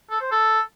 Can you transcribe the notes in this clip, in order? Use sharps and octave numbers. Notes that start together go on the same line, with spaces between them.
A4
C5
A4